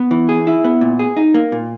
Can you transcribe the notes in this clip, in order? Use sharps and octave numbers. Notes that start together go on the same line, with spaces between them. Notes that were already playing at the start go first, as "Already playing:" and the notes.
Already playing: B3
E3
G#4
E4
B3
A#2
G#4
D#4
A#3
A#2